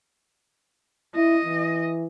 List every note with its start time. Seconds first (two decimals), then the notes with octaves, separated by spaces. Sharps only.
1.16 E4 D#5
1.45 E3